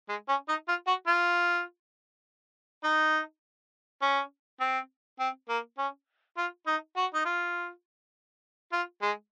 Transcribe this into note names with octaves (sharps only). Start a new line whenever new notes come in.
G#3
C#4
D#4
F4
F#4
F4
D#4
C#4
C4
C4
A#3
C#4
F4
D#4
F#4
D#4
F4
F4
G#3